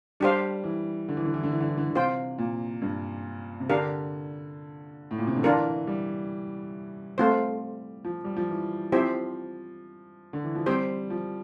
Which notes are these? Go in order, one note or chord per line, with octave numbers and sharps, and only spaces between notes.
G3 D4 G4 C5 F5
E3
D3
E3
D3
E3
D3
E3
D3
E3
D3
D3
C3 F4 C5 G5
A#2
G2
C3
D3 D4 G4 A#4 F5
A2
A#2
C3
D3
E3 D4 F4 A#4
G3
A3 C4 F4 C5
F3
G3
F3
E3
F3 C4 E4 G4 C5 E5
D3
E3
F3
G3 C4 G4 C5 G5
F3